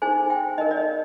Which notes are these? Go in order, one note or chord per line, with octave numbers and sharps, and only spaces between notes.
D#4 G#4 C5 G#5
G5
D#4 A#4 D#5
D5
D#5